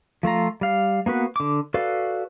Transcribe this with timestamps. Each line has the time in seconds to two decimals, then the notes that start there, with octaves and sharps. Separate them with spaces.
0.23 F3 A3 F4 A#5
0.61 G3 F5
1.06 A#3 B3 F#4 B4
1.36 D3 D6
1.74 F#4 A4 B4 D5 F5